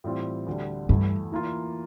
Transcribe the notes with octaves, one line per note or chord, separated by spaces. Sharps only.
A2 E3 G3 C4 F4
D2 D3 G3
E2 G2 E3 A3 E4
E3 A#3 F4